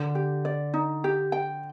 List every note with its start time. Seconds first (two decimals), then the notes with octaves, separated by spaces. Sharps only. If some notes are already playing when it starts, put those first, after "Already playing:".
Already playing: D3
0.15 G4
0.45 D5
0.74 D#4
1.04 G4
1.32 G5